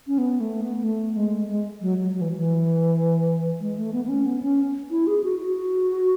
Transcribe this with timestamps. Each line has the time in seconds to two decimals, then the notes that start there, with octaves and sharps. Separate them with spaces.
0.07 C#4
0.18 B3
0.40 A3
0.61 B3
0.84 A3
1.16 G#3
1.49 G#3
1.81 F#3
1.98 F#3
2.14 F#3
2.21 E3
2.36 E3
3.60 G#3
3.77 A3
3.93 B3
4.05 B3
4.09 C#4
4.26 B3
4.42 C#4
4.91 E4
5.07 G#4
5.24 F#4
5.40 F#4